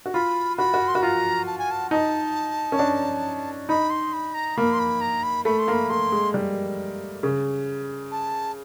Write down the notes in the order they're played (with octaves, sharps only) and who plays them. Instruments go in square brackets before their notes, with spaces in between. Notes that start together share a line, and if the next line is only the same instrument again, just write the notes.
[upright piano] F#4
[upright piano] F4 [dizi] B5
[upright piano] F#4 [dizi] B5
[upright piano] F#4
[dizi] C6
[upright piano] F#4 [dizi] B5
[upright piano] F4 [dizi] A#5
[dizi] A5
G#5
A5
[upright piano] D#4 [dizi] A5
[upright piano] C#4
D4
[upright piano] D#4 [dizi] B5
[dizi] C6
B5
A#5
[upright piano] A#3 [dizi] B5
[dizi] C6
B5
A#5
B5
[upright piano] A3 [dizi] B5
[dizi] C6
[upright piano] A#3
[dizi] B5
[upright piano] A3 [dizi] C6
[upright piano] G#3
G3
C#3
[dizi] A5